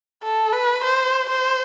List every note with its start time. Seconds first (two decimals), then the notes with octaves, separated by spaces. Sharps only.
0.23 A4
0.52 B4
0.83 C5
1.29 C5